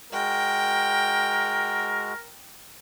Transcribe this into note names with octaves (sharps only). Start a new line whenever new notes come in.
G#3 F#4 A#4 G5